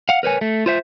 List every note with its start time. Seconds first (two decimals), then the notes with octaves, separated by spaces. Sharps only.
0.09 F5 F#5
0.23 A#4 B4 C#5 G#5
0.41 A3
0.66 F4 C5 E5